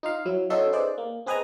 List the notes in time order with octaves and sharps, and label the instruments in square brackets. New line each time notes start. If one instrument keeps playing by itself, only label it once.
[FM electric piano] D#4 F4 F5
F#3 E4
C#4 D#4 F#4 A4 E5 C6
D#4 G#4 B4 C5 D5
A#3
C4 G#4 B4 D#5 G#5 A#5